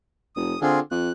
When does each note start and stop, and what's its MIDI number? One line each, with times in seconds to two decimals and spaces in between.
0.36 0.55 29
0.36 0.59 87
0.61 0.80 50
0.61 0.79 60
0.61 0.79 65
0.61 0.79 68
0.91 1.12 41
0.91 1.12 90